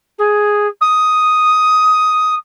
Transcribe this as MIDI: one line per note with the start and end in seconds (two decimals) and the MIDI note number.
0.18 0.67 68
0.81 2.35 87